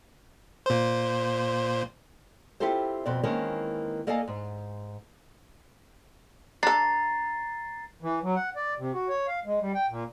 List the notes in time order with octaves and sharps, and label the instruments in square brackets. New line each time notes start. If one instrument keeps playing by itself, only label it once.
[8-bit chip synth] A#2 C5
[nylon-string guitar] C4 E4 F4 G4 A4 C5
F2 B2 C4 D5
D#3 E3 G#3 A#3 C4 C#4
A#3 A4 D5 D#5 F5 G#5
G#2
[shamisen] D4 A4 [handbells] A#5 [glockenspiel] A6 C7
[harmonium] E3
F#3
F#5
D5
C3
F#4
C#5
F5
G#3
G3
G5
A#2